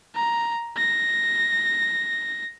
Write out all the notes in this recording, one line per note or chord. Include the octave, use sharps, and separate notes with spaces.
A#5
A#6